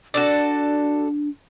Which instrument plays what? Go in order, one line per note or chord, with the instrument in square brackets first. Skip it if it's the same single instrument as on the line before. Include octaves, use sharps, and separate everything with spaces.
[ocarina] D4 [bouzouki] F#4 A4 D5